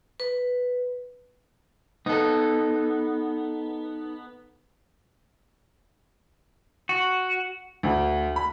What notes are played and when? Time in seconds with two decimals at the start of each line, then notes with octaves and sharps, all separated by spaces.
0.20 B4
2.06 B3 D#4 A4
6.89 F#4
7.83 D2
8.36 B5